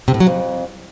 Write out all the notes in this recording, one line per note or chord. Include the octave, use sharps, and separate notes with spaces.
C3
A2
F#3
F2